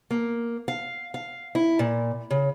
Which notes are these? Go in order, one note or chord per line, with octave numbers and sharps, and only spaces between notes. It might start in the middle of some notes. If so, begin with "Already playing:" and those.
A#3
F5
F5
E4
A#2
C#3